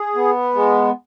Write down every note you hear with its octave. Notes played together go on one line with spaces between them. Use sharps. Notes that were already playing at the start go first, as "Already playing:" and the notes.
Already playing: G#4
B3
G#3